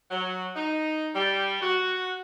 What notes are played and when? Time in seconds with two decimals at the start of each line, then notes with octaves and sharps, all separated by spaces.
0.11 F#3
0.56 D#4
1.15 G3
1.62 F#4